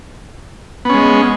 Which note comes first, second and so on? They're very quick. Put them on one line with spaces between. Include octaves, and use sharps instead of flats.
B3 C#4 G#3